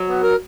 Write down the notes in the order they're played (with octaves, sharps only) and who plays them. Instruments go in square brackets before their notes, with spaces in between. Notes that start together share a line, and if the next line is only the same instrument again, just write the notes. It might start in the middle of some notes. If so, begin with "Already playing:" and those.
Already playing: [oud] F#3
[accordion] B3
A#4